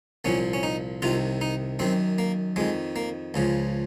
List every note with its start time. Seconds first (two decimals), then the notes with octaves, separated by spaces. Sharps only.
0.25 C2 A#2 F3 C#4
0.53 C#4
0.63 D#4
1.02 C2 C3 D#3 F4
1.41 D#4
1.79 F#2 D#3 C4
2.18 A#3
2.56 F2 D#3 G#3
2.96 A#3
3.34 C#2 C#3 F3